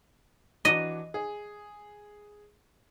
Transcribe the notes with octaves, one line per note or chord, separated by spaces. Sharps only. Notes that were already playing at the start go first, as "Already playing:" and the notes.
E3 D4 F#4 D#5
G#4